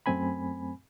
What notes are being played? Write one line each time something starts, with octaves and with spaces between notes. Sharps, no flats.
F#2 A3 C4 G#5 B5